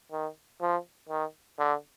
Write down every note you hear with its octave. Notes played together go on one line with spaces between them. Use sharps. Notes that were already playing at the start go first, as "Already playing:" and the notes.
D#3
F3
D#3
D3